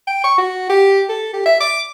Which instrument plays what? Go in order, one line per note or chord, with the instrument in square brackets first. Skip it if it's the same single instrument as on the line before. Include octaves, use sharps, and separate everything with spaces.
[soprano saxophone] G5
C#6
F#4
G4
A4
G4
E5
D6